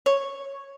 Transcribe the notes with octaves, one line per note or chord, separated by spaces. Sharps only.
C#5